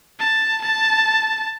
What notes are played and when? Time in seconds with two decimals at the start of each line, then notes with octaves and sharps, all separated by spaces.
0.19 A5
0.62 A5